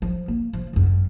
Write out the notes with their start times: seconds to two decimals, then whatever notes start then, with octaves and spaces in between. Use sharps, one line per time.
0.02 F3
0.28 A#3
0.53 F3
0.73 G#1 F#2